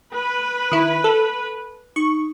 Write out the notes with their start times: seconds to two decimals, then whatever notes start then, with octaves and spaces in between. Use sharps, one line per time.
0.11 B4
0.71 D#3 E4
1.04 A4
1.96 D#4 C#6